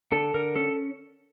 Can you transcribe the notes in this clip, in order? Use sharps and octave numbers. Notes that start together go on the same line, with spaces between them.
D3 A4
D3 A#4
C#4 A4